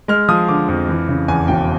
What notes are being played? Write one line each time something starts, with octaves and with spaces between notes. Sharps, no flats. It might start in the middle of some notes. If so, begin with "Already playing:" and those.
G#3 F6
F3 D#6
D3 D6
F2
E3
C#3
E2 G#5
E1 G5